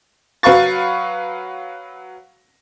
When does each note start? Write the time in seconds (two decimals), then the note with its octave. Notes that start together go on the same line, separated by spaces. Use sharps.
0.43 F#3 B4 F5 C#6 A6